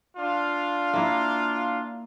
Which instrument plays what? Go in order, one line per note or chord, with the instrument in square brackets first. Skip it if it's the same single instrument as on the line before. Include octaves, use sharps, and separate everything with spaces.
[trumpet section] D4 F4 F5
[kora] A#3 E4